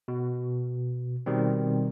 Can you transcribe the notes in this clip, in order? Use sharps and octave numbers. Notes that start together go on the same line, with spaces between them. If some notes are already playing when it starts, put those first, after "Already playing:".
B2
B2 D#3 G3 C4